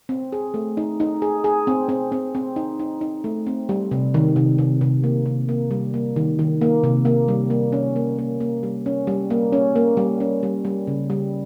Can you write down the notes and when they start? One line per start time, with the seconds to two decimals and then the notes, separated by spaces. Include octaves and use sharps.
0.09 C4
0.33 G#4
0.54 A3
0.77 D#4
1.00 D#4
1.22 G#4
1.44 G#4
1.67 C4
1.89 C4
2.12 C4
2.35 C4
2.56 D#4
2.80 D#4
3.01 D#4
3.24 A3
3.47 C4
3.69 G3
3.91 C3
4.14 D#3
4.36 C3
4.58 C3
4.81 C3
5.04 A#3
5.26 C3
5.49 A#3
5.71 G3
5.94 A#3
6.16 D#3
6.39 D#3
6.61 A#3
6.84 C3
7.05 A#3
7.28 G3
7.50 A#3
7.72 C#4
7.96 A#3
8.19 A#3
8.40 A#3
8.63 G3
8.86 C#4
9.07 G3
9.30 A#3
9.53 C#4
9.76 A#3
9.97 G3
10.20 C#4
10.43 G3
10.65 G3
10.87 C#3
11.10 G3